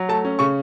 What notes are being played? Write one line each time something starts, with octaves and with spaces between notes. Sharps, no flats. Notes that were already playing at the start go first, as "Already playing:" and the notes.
Already playing: F#3
A3 A5
C#4
C#3 C#6